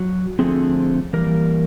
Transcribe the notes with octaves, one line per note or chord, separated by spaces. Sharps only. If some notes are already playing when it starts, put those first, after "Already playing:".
Already playing: F#3
D3 F3 A3 C4 G#4
E3 G3 A#3 A#4